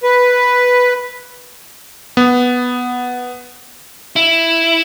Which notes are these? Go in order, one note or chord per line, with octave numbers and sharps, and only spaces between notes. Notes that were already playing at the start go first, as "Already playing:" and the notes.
B4
B3
E4